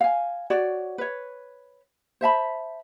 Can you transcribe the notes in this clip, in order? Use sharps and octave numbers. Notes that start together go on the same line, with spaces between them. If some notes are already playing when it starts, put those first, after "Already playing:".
F5 G#5
F#4 C#5 D5
B4 C#5
C5 E5 A5 B5